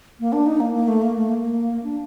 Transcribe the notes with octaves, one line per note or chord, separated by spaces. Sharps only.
A#3
D4
D#4
A#3
A#3
A3
A#3
A3
A#3
D4